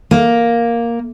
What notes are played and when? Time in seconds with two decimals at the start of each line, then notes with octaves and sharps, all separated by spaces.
0.11 A#3